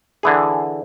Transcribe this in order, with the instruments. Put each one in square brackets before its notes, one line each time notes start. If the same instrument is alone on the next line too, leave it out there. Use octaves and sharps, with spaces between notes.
[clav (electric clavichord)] D3 E3 G#4